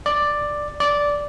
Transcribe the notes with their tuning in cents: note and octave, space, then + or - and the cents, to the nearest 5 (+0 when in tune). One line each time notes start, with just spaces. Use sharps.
D5 +5
D5 -10